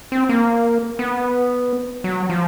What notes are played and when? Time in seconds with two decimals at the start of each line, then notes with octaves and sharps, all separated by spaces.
0.12 C4
0.29 A#3
0.99 B3
2.04 F#3
2.30 F3